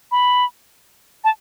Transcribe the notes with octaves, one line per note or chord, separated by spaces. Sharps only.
B5
A5